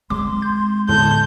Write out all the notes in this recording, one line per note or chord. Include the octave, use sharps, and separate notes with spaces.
G#3 C4 C6 D6
G6
E2 A2 D3 A5 G6